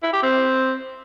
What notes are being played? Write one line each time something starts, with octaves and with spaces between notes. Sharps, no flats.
E4
G4
C4